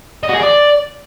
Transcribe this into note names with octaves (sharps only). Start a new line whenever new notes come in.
D#5
F#4
G#4
D5